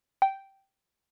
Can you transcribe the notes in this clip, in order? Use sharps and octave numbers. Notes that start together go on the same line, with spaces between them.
G5